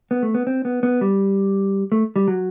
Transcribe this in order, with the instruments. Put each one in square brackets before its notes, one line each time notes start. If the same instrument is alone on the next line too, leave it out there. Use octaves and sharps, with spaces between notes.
[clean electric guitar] B3
A3
B3
C4
B3
B3
G3
A3
G3
F#3